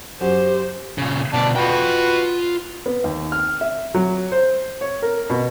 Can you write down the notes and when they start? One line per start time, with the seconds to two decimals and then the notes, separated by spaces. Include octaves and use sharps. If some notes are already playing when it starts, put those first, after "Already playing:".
0.21 F#2 F#4 G4 C5
0.98 A#2 C#3
1.34 D2 B2 D5 A5
1.56 F4 F#4 B4 G5
2.86 B3
3.04 D#2
3.32 F6
3.61 E5
3.94 F#3
4.32 C5
4.81 C#5
5.02 A#4
5.30 B2